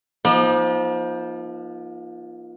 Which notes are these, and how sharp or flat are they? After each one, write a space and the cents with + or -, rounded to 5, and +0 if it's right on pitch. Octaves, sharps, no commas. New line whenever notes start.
F3 +0 A#3 +45 D#4 +20